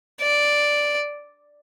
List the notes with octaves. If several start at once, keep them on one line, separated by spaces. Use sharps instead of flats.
D5